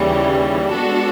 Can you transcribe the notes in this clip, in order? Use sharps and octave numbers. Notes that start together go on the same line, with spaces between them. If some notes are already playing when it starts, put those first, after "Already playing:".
Already playing: D#2 C#3 E3 G3
G#3 B3 D4 F#4 A4